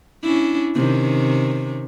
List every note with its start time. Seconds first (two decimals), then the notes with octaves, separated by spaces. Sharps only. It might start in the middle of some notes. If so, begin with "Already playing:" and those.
0.23 C#4 D4 E4
0.75 C3 D#3 C#4